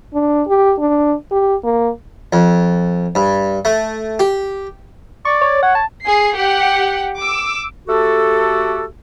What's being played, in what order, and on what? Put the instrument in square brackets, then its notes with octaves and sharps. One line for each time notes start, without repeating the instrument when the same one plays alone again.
[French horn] D4
G4
D4
G4
A#3
[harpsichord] F2
G2
A3
G4
[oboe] D5 [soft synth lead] C#6
[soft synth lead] C#5
[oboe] C#5 [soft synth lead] F#5
[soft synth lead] A5
[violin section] G#4 C7
G4 F#5
D6 E6
[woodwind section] A3 F#4 G4 A4